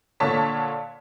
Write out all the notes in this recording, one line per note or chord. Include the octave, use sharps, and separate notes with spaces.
A#2 D3 C#5 A5 B6